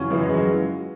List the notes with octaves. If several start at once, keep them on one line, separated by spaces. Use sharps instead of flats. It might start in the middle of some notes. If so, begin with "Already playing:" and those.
Already playing: F#2 C#3 E3 C#4 F#4
F#2 C#3 E3 B3
G#3
F#3